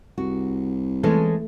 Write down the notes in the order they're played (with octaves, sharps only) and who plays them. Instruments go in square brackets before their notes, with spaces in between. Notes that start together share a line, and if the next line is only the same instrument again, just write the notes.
[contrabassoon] C2 [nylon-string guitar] F#4
[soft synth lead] E3 [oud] G#3 C#4 A4 [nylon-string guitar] A3